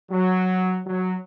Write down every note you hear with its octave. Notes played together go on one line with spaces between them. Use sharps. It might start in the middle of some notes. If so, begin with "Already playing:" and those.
F#3
F#3